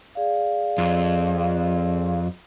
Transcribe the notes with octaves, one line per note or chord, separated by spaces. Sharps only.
G#4 D5 F5
F2